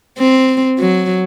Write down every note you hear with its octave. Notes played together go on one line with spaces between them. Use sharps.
C4
F#3